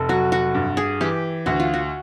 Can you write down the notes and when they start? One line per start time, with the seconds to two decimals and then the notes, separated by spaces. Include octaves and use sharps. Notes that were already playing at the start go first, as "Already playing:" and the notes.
Already playing: F1 A4
0.09 F#3 F#4
0.32 F#4
0.54 G2
0.77 G#4
1.01 E3 G4
1.46 D2 F#4
1.60 F4
1.74 F#4